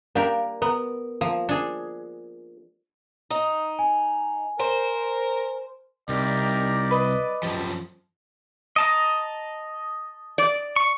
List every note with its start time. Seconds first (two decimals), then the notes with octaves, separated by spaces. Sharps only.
0.15 A#3 D4 G4 A#4
0.62 B3 A#4
1.21 F3 A#3
1.49 D4 G#4
3.30 D#4 D#6
3.79 G#5
4.59 A#4 C5
6.09 C2 D#4 G4 A#4 D5
6.91 B4 D#5
7.43 F#2 F3 G4 A5
8.76 D#5 A5 A#5
10.38 D5
10.76 C#6